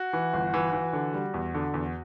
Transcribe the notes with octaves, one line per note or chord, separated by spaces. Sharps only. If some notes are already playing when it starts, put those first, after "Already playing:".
Already playing: F#4
E3
G1
E3
E3
D3
G3
E2
D3
E2